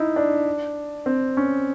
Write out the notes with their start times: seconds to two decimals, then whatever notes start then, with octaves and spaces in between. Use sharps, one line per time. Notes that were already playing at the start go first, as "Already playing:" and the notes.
Already playing: D#4 E4
0.16 D4
1.06 C4
1.37 C#4